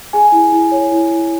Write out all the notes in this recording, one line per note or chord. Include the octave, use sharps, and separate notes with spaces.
G#4 G#5
E4
E4
C#5
E4
E4